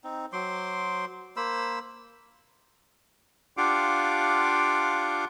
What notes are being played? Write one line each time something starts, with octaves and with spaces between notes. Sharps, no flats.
C4 D#4
F#3 C5 C6 D6
A#3 C5 B5 E6
D4 F4 G4 F5 F#5 D6